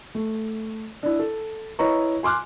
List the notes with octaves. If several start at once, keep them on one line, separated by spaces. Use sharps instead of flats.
A3
D4 E4
A4
E4 B4 C#5 D#5 A#5 C#6
G#5 C6 D6 F6 F#6